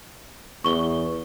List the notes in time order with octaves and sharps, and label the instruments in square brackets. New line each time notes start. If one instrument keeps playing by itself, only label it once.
[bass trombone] E2 [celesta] C#6 G7